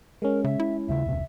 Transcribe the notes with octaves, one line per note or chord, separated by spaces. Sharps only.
G#3 C#4 A#4
C#3 E5
E4
D#2 C#3 A3 E5
E1 C#2 C3